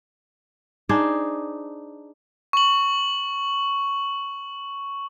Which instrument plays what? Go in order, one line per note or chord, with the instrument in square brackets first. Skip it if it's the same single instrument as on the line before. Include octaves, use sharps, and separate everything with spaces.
[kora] D4 D#4 G#4 C5
[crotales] C#6 F#7